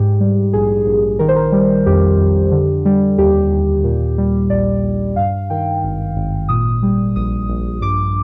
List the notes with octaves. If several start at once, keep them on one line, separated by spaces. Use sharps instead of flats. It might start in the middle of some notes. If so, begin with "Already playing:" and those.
Already playing: G#2 G4
G3
A#1 G#4
A#1
D#3 A#4
C5
A#4
G3
F2 G4
F2
D3
G3
D#2 G4
D#2
A#2
G3
A#1 D5
A#1
G2 F5
D#3 G5
G#1
G#1
A#2 D#6
G3
A#1 D#6
A#1
G2 D6